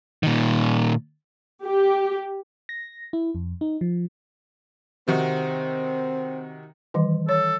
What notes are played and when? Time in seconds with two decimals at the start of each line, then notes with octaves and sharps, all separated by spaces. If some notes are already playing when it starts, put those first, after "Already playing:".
0.23 A#2 D#3
1.63 G4
2.69 A#6
3.13 E4
3.35 F2
3.61 D#4
3.81 F3
5.08 C3 D#3 C4 F#4
6.94 D#3 E3 G3
7.29 A4 C#5